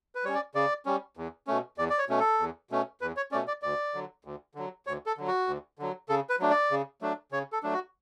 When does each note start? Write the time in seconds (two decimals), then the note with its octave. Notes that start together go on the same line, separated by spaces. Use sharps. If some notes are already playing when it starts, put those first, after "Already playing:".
0.15 B4
0.24 G3 C#4 C#5
0.34 D5
0.55 C#3 D5
0.86 G3 C#4
1.17 E2
1.47 B2 A3 C#4
1.78 E2 D5
1.90 D5
1.99 C#5
2.08 B2 A3 C#4
2.20 A4
2.39 E2
2.71 B2 A3 C#4
3.01 E2 B4
3.17 C#5
3.32 B2 A3 C#4 D5
3.48 D5
3.62 D2 D5
3.94 D3 F#3
4.25 D2
4.55 D3 F#3
4.87 D2 C#5
5.06 A4
5.17 D3 F#3
5.27 F#4
5.47 D2
5.79 D3 F#3
6.09 C#3 A4
6.30 B4
6.39 F#3 A3 D4
6.50 D5
6.71 C#3
7.01 F#3 A3 D4
7.32 C#3 C#5
7.52 A4
7.63 F#3 A3 D4
7.73 F#4